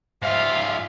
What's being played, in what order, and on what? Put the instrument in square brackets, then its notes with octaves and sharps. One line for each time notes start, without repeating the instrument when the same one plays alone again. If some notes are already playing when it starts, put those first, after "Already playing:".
[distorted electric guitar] G#2 F4 [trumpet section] G3 F5 [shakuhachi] E5